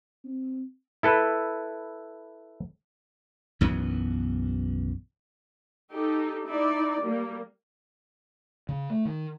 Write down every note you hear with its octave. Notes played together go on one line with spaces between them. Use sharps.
C4
E4 A4 B4
B1 F#2 E3 B3
D#4 G4 A4
D#4 E4 D5
G3 A#3
C#3
A3
D#3